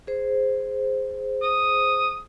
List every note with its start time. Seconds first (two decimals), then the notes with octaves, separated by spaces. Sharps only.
0.07 G#4 C5
1.42 D#6